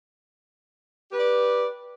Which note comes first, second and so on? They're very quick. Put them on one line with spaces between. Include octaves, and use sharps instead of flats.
G4 B4 D5